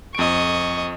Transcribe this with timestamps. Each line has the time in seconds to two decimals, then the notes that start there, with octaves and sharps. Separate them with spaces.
0.15 F2 D#5 C#6 D7